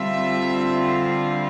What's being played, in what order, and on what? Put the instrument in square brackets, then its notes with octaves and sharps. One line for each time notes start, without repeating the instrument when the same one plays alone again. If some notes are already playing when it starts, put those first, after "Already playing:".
Already playing: [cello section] D3 G3 C4 F4 E5